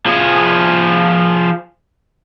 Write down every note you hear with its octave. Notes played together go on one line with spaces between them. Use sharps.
F3 G#4